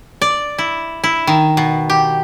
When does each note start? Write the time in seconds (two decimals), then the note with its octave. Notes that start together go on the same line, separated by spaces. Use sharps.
0.22 D5
0.58 E4
1.04 E4
1.27 D#3
1.57 B2
1.90 G4